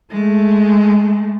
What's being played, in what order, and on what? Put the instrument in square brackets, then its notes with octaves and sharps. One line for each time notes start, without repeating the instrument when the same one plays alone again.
[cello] G#3 A3